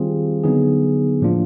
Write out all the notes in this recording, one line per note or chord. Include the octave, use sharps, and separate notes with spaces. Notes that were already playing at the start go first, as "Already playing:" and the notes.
Already playing: D#3 G3 C4 F4 G#4
D3 F#3 B3 D#4 G#4
A2 F3 A#3 D4 F4